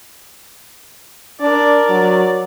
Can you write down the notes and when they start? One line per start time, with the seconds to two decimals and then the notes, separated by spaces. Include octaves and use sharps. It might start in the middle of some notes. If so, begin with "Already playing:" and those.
1.41 D4 A#4 D5
1.89 F#3